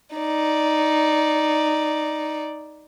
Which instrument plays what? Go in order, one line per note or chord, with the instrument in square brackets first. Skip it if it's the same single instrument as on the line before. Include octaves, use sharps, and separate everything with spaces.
[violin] D#4 D5